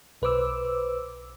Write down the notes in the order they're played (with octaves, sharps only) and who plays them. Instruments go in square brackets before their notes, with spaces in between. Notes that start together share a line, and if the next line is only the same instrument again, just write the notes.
[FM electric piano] B1 B4 C5 D6 E6